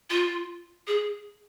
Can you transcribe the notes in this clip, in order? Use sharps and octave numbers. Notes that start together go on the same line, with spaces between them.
F4
G#4